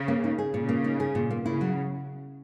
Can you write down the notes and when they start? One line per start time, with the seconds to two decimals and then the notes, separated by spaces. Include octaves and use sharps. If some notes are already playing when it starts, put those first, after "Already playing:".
Already playing: C#3
0.08 A#3
0.24 D#4
0.38 G#4
0.54 A#2 C#3
0.69 A#3
0.84 D#4
1.00 G#4
1.15 A#2
1.31 A#3
1.46 C#3 E4
1.61 F#3